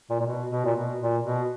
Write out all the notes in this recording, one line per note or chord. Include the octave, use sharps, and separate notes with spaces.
A#2
A#2
B2
B2
A#2
B2
A#2
B2